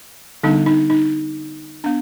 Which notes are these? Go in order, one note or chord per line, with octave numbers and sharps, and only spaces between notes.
D3 G3 B3 D4 D#4
D#4
D#4
B3 D4